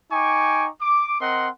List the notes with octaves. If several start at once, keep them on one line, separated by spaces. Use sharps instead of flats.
D#4 G5 G#5 C#6 D6
D6
C4 A#4 D#5 F#5 C6